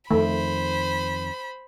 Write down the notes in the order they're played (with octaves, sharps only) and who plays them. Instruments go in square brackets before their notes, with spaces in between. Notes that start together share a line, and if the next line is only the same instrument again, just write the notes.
[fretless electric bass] F2 D#3 [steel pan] A3 [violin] C5 B5